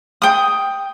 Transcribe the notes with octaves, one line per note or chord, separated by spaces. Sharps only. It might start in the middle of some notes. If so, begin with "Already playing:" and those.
G5 D#6